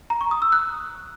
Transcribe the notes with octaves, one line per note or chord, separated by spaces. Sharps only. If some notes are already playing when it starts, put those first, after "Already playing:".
A#5
C#6
D#6
E6
F#6